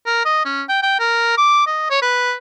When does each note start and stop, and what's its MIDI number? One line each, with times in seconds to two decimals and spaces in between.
0.06 0.22 70
0.25 0.45 75
0.45 0.62 61
0.69 0.81 79
0.83 0.95 79
1.00 1.34 70
1.37 1.66 86
1.67 1.88 75
1.90 2.01 73
2.02 2.33 71